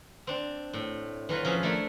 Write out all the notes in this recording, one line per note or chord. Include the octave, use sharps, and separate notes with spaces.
C4 D4
A2
E3 F#3 F4 B4
F3 C#4 G#4 E5
A3 D4 E4 A#4